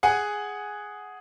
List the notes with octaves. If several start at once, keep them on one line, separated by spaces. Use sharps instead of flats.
G#4 F#5 G#5